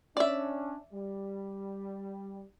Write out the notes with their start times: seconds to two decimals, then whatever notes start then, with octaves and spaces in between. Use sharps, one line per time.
0.17 C#4 D4 D5 E5
0.93 G3